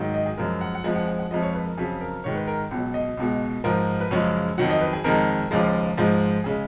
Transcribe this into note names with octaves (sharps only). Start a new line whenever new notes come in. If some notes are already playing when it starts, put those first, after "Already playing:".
Already playing: G#2 D#3 F#3
D#5
G#4
F#2 F3 G#3 A#4
F#5
F#5
F2 F3 G#3 G#5
F#5
G#5
F#5
F2 F3 G#3 D#5
C#5
B4
A#4
F2 C#3 F#3 G#4
A#4
G#2 D#3 G#3 C#5
B4
A#4
C#2 B2 F#3
D#5
C#2 B2 G#3
G#2 F3 G#3 A#4
B4
F#2 C#3 F3 G#3 C#5
F2 D#3 F#3 F#5
D#5
B4
G#4
F2 D#3 G#3 A#4
D#2 C#3 F3 G#3
G#2 F3 G#3
C#3 G#3 G#4